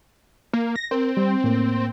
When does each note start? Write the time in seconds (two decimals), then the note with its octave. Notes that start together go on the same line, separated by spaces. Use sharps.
0.53 A#3
0.76 A#6
0.91 C4 A#4
1.17 G3
1.44 A2 A#3